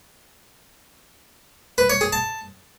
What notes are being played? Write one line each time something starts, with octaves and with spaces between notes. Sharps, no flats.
B4
C#5
G#4
A5